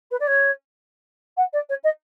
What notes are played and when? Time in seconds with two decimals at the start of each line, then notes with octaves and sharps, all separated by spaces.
0.11 B4
0.20 D5
0.27 C#5
1.37 F#5
1.53 D5
1.69 C#5
1.83 D#5